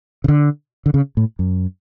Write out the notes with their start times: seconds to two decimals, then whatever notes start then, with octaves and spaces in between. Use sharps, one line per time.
0.24 C#3
0.28 D3
0.86 D3
0.94 C#3
1.17 A2
1.39 F#2